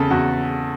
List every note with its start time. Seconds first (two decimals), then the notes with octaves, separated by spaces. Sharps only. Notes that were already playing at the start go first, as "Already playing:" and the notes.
Already playing: E2 C#3 A4
0.11 E2 F#4